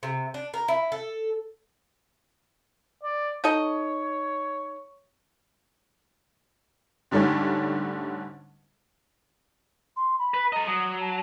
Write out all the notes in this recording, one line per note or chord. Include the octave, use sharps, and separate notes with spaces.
C3
D4
A#4
E4
A4
D5
D#4 A4 C#5 D#5
G#2 D3 G3 A3 C#4 D4
C6
B5
B4
A4 D#5 A#5
F#3 D#6
A5